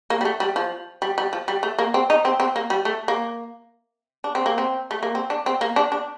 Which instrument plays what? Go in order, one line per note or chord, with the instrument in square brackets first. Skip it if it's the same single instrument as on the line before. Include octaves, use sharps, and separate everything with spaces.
[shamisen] A#3
G3
A3
G3
F3
G3
G3
F3
G3
A3
A#3
C4
D#4
C4
C4
A#3
G3
A3
A#3
D4
C4
A#3
C4
A3
A#3
C4
D4
C4
A#3
D4
D4